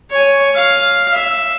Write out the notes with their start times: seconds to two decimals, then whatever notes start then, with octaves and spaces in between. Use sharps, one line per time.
0.11 C#5 G#5
0.55 F5
1.14 E5